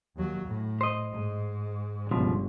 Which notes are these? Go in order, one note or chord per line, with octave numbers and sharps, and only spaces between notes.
D#2 F#3
A2
C5 D#5
G#2
G1 C#2 B2 F3